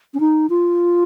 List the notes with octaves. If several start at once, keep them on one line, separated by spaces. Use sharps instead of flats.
C#4
D#4
F4